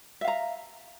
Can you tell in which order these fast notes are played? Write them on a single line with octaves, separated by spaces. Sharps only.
E5 F5 A#5